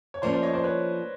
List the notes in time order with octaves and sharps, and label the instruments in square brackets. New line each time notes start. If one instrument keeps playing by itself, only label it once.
[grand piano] C#5
[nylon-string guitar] F3 A#3 C#4 [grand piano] C5 D5
[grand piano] C5 D5
C#5 D#5
C5 D5
B4 C#5